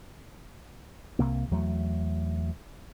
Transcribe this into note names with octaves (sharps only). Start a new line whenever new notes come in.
C2 C3 A#3
E2 F#3 A3